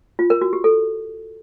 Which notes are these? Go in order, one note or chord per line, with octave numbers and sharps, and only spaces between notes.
F4
A#4
F#4
G4
A4